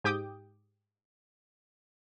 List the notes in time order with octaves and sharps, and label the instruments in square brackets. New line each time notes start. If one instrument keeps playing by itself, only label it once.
[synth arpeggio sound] G#2 G4 G5 D6 D#6 G6